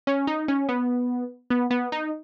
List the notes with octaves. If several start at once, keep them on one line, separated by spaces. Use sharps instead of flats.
C#4
D#4
C#4
B3
B3
B3
D#4